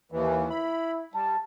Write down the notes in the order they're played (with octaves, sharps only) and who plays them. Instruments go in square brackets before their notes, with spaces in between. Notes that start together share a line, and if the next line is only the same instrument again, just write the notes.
[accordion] D#2 E3
[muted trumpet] E4 [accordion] B5
[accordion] G3 [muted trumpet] A5